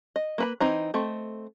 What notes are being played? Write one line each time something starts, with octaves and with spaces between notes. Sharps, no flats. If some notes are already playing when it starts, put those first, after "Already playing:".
D#5
A#3 B4 B5
E3 C4 D#4 A#5
A3 C4 D#5